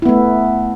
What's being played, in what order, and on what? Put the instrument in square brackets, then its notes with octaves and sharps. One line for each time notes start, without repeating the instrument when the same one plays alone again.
[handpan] E4
B3
A3